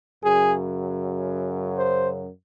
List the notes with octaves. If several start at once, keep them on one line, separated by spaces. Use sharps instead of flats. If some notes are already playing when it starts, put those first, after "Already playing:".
F#2 C#3 F#3 G#4
C5